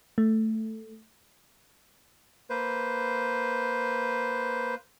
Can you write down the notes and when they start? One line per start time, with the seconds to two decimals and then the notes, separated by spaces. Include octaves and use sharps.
0.18 A3
2.50 A#3 B4 C5